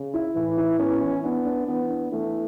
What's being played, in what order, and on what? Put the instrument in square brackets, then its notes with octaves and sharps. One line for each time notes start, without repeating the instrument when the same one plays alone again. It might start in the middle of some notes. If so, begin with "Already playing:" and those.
Already playing: [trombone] C#3
[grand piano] E4
[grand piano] A2 [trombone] E3
[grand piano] E4
[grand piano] B3 [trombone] C#4
[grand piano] E3
[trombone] B3 [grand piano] D4
[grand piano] D4
[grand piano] E3 [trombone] B3
[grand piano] D4
[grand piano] E3 [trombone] A3